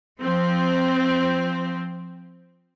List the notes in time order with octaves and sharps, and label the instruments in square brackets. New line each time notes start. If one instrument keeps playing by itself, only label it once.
[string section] F3 C4